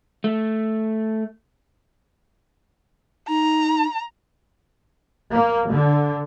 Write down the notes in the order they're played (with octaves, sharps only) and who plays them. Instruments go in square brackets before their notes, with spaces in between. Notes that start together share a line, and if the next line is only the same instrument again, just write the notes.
[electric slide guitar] A3
[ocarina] D#4 [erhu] A#5
[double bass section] A#3
D3